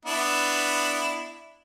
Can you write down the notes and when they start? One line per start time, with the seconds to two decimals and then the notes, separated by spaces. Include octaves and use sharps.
0.05 B3 D4 E4